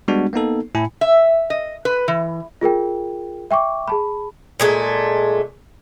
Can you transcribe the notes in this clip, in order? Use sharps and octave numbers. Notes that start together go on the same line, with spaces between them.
G3 G#3 B3 D4 F#4
A#3 B3 D#4 A4
A2 E4 G#5 B5
E5
D#5
B4
E3
F4 G#4 A#4 G5
E5 G5 C#6 D6
G#4 A5 B5
A#2 G#3 A3